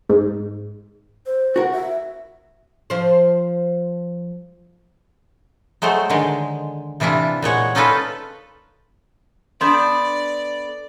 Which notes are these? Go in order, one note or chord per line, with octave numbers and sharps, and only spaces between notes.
G#2
C5
F#4 A#4 F#5
E5
F3 C5
F#3 G#3 A3 A4 C5
D3 D#3 G#3
C3 E3 D4 E4 F4
A#2 G#3 C#5 F#5
C#4 D#4 F4 A4 B4
B3 D4 A4 D5 C6 G6